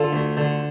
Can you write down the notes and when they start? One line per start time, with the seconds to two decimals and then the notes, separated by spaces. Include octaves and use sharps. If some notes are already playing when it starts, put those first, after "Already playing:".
Already playing: D3 F4 A4
0.13 D2
0.37 D3